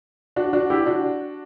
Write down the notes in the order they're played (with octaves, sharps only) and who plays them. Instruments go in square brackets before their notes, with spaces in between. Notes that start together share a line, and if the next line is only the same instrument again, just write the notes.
[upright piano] D4 F#4
D4 F#4
E4 G4
D4 F#4